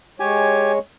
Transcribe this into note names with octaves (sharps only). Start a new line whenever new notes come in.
G#3 G4 C#5 G#5